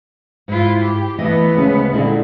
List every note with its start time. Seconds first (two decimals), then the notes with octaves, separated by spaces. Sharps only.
0.48 G#2 E4 F4
0.82 G4
1.18 E3 A3 B3 D#5
1.55 D2 C#3 G#3 C#4
1.92 A#2 D3 G#3 C4 D#4 E4 A4